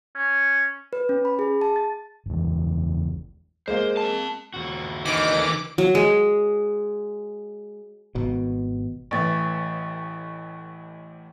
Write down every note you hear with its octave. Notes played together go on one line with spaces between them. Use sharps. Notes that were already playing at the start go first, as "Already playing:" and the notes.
C#4
B4
C#4
B5
G#4
A5
A6
F#1 E2
G#3 A#3 C5
C4 A5
D#2 F#4
D2 D#3 E3 D#4 D#5 D6
F#3
G#3
G#1 B2
A1 A2 E3 C#6 A6